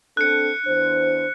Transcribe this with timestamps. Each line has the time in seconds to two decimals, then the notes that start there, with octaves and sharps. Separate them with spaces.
0.17 C4 D4 A4 F#6 C#7
0.66 E2 D4 C5